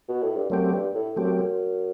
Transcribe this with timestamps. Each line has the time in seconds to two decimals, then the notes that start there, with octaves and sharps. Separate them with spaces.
0.09 B2
0.23 A2
0.36 G2
0.50 F#2 F#3 A3 C4 G4
0.72 G2
0.95 A2
1.16 F#2 F#3 A3 C4 G4